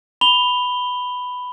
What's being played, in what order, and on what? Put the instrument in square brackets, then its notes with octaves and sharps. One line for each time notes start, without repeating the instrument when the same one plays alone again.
[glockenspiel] B5 F7 G7